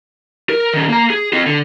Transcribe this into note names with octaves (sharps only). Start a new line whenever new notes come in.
A#4
D#3 C#4
A#3 A#5
G#4
C4 F4
D3